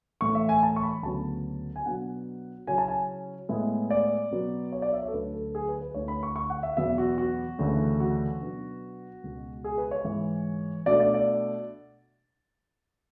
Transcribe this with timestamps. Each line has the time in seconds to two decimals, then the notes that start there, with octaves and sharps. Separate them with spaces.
0.21 A2 E3 A3 C#6
0.35 E5
0.49 G#5
0.63 A5
0.76 C#6
0.83 B5
1.03 D2 C#3 F#3 B3 A5
1.76 G#5
1.85 B2 F#3 B3 D4 F#5
2.67 C#3 F#3 C#4 E4 G#5
2.78 A5
2.88 G#5
3.49 A2 G#3 B3 E4
3.90 D5
4.31 B2 F#3 B3
4.72 C#5
4.82 D5
4.93 E5
5.03 C#5
5.08 A4
5.13 D2 D3 F#3 B4
5.34 A4
5.55 G#4
5.68 B4
5.82 B4
5.94 D2 D3 A3 E4 C#5
6.08 B5
6.23 C#6
6.36 C#6
6.50 F#5
6.63 E5
6.77 E2 B2 F#3 B3 E5
6.98 F#4
7.18 F#4
7.59 D2 C#3 E3 A3 E4
8.00 F#4
8.42 B2 F#3 B3 D4
9.23 C#2 B2 G#3
9.64 G#4
9.78 B4
9.91 C#5
10.04 G#2 E3 G#3
10.86 B2 A3 D4 D5
11.00 D5
11.14 D5